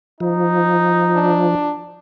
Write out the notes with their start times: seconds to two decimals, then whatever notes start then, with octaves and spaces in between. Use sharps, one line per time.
0.20 F3 D#4
1.14 D4